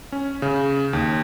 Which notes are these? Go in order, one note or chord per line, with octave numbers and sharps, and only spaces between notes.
C#4
C#3
D#2